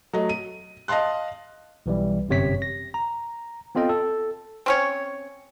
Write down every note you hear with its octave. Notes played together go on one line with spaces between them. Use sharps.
F#3 A3 D#5
D#7
D#5 F5 A5 C6 F#6
B1 E3 G3
G1 F#2 C3 C#5 B6
A#6
A#5
B3 C4 F4 A4 D#5 G5
A4
C4 C#4 C#5